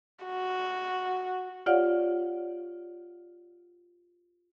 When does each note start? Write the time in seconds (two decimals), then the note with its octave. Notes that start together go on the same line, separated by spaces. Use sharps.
0.25 F#4
1.66 F4 G4 C#5 D5 F5 F#5